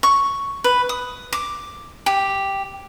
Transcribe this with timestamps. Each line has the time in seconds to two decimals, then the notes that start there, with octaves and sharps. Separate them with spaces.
0.03 C#6
0.64 B4
0.89 D#6
1.33 D6
2.06 G4